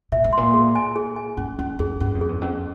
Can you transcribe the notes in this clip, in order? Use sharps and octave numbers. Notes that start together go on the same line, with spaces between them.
A#2 E5
G#2
A#2 C6
G#4
G#5
G#4
G#5
G2 C#4
F2 C#4
F2 G#4
G2 C#4
F2
G#4
E2
F2 C#4